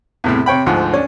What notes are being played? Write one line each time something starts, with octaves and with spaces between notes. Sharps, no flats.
E2 A2 C3
C3 C#5 G5 B5
D2 G#2 F3
C#4 D4